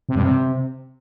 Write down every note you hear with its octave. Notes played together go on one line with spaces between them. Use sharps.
C3
G2
C3